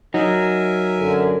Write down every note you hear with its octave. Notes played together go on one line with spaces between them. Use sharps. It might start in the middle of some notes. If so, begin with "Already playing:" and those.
F#3 D#4 A#4 E5 G#5
F#2 D3